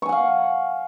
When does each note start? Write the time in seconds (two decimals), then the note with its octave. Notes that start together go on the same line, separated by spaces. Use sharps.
0.02 C#6
0.06 G#5
0.09 F#5
0.12 F5